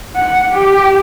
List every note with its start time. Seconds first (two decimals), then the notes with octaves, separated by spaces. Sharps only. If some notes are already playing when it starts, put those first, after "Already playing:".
0.16 F#5
0.52 G4